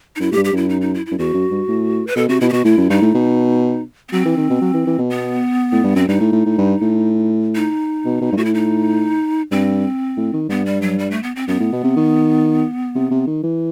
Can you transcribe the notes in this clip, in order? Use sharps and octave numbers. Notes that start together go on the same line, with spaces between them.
D#4
F#2 E4
A2 G4
G2
G4
F#2 E4
D#4
D#4
E4
E4
F#2
E2 F#4
F#2
G2
A2
B4
B2 A4
C3 F#4
B2 E4
G4
B2 F#4
A2 E4
F#2
G2 D#4
A2
B2
B3
F#3 C4
E3
D#3
B2
F#3
E3
E3
B2
B3
A2
G2
F#2 C4
G2 D#4
A2
A2
A2
G2
A2
D#4
B2
B2
G2
A2 F#4
E4
D#4
G2 C4
A2
D#3
G2 B3
G3
F#3
G3
A3
B3
C4
F#2 B3
A2
B2
C3
D#3
C3
C3
D#3
E3